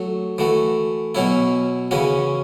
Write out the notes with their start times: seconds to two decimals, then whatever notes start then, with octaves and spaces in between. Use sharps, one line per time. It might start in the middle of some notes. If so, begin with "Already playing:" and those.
Already playing: F#3 A3 F#4
0.38 E3 A3 F#4
1.15 B2 F#3 C#4 E4
1.91 C#3 E3 C#4 F#4